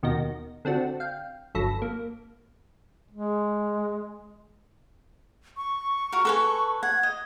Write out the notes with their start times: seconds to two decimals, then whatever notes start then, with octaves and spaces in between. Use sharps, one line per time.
0.03 D#2 B2 A#3 D#4 A#6
0.65 D3 C4 D4 F#4
1.00 F5 G5
1.55 G1 F#3 A4 B5 A#6
1.82 A#3
3.11 G#3
5.57 C#6
6.12 F#4 A#4
6.25 A4 B4 G#5
6.83 F#5 G#6
7.03 D#5